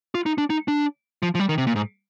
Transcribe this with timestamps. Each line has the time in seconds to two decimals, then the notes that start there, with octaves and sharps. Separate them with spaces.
0.15 F4
0.26 D#4
0.38 D4
0.50 D#4
0.68 D4
1.23 F3
1.35 F3
1.39 G3
1.49 D#3
1.58 C3
1.67 A#2
1.76 G#2